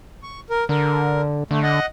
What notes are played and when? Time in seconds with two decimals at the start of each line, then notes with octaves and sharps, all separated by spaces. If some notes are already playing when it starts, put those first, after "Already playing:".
0.23 C#6
0.50 A#4
0.69 D3 A#4
1.51 D3 A3
1.63 D#5 F#5